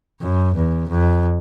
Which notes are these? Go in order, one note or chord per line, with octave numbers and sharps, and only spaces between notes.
F#2
E2
F2